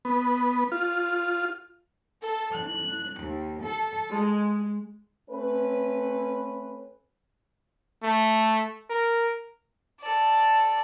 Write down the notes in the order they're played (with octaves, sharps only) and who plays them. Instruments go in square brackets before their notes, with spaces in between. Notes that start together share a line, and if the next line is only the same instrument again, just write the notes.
[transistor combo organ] B3
F4
[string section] A4
F#6
D#2
A4
G#3
[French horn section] A3 C4 C#4 B4
[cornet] A3
A#4
[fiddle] A4 D5